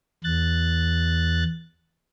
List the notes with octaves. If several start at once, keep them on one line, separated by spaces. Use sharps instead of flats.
E2 F#6 A6